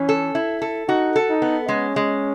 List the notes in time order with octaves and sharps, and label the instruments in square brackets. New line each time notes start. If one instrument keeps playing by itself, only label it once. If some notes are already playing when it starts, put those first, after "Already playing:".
Already playing: [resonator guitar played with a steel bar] E3 [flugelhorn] C#4
[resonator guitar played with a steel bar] A4
E4
A4
[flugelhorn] D#4 [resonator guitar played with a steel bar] F#4
[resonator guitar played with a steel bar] A4
[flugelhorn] D#4
[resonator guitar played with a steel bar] B3
[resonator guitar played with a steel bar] G#3 [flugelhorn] C#4
[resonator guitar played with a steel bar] G#3